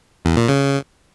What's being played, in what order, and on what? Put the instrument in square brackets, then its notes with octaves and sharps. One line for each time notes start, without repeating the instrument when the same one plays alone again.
[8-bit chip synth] E2
A#2
C#3